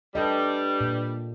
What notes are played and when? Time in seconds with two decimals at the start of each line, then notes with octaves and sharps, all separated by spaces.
0.15 G3 D4 G4 A4 B4 D#5
0.81 A#2